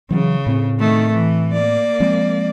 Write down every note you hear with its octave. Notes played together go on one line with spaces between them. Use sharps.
C#3 E3 F#3
A2 C4
D#3 A3
E3
A#3 D5
F3 G#3 C4